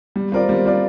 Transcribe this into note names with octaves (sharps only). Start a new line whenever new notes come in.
G3
C4 F4 A#4 D5
G3
C4 F4 A#4 D5